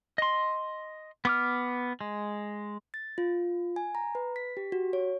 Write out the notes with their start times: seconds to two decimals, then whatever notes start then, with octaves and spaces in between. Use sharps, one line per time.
0.18 D#5 C6
1.25 B3 D6 F6
2.01 G#3
2.94 A6
3.18 F4
3.76 G#5
3.95 A#5
4.15 B4
4.36 B6
4.57 G4
4.72 F#4
4.93 C#5